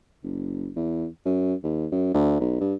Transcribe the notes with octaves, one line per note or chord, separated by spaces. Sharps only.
F#1
E2
F#2
D#2
F#2
D2
B1
G2